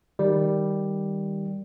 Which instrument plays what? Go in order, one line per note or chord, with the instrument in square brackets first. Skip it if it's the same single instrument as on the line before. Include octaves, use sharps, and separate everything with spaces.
[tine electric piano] D#3 G3